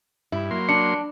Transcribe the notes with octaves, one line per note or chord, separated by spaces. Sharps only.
G2 E4
F#3 A#3 C6
D4 C#7